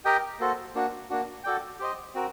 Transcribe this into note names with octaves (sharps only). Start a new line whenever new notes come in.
G4 A#4 D#5 G5
A#3 F#4 A4 C5
A#3 D4 F#4
A#3 D4 F#4
F#4 A4 D5 G5
G4 C5 D#5
C4 F#4 A#4